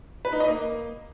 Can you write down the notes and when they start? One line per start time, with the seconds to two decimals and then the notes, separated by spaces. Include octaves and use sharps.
0.25 B4
0.33 D#4
0.40 D#5
0.48 A#3